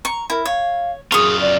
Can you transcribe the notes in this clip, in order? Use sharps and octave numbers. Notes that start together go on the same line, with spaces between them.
A#5 C#6
E4 A#4
C#5 F5
F#2 F4 G#4 C#6 D#6
D5